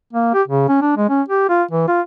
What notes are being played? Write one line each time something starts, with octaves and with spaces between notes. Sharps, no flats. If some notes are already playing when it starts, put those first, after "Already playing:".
A#3
G4
C#3
C#4
D4
G#3
C#4
G4
F4
E3
F4